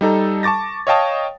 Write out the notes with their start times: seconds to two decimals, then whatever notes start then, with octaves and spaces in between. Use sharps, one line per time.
0.01 G3 D#4 A4 A#5
0.43 A5 C#6 D6 A6 A#6
0.87 C#5 D#5 F5 G5 A5 D#6